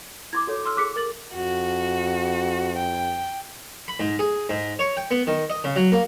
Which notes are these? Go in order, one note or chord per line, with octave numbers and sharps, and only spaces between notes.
E4 C6 D6 G#6
F#4 A4 C#5
C6 E6 F6
G#4 D6 F#6 B6 C#7
A#4 A6 F#7
F2 F#4
G5
B5
G#2
G#4
G#2
C#5
G5
B3
D#3
D#5
C#3
F#3
A#3